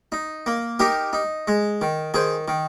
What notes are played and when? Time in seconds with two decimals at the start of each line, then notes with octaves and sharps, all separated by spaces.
0.12 D#4
0.46 A#3
0.79 D#4 G4 A#4
1.13 D#4
1.48 G#3
1.81 D#3
2.14 D#3 G#4 C5
2.48 D#3